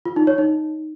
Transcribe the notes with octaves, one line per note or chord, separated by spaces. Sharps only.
F4
D#4
C#5
D#4